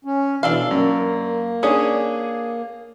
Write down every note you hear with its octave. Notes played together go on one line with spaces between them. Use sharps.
C#4
B2 E3 D4 A4 F5
F#2 A#3
C#4 D4 G#4 D#6